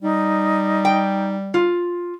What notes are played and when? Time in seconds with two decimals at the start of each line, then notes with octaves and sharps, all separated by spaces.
0.02 G3 D#4
0.85 G5
1.54 F4